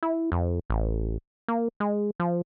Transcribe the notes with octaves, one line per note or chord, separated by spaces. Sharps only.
E4
F2
A1
A#3
G#3
F3